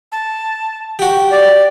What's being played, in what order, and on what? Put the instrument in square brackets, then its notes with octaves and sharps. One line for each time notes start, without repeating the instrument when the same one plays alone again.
[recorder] A5
[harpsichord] F#4 G4 [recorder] G5
[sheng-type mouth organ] D5